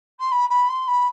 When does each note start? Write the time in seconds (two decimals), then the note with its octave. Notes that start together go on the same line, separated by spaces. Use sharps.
0.19 C6
0.31 B5
0.49 B5
0.69 C6
0.87 B5